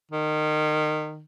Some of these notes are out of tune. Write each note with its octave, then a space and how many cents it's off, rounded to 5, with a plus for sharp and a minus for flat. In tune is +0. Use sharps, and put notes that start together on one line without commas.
D#3 -25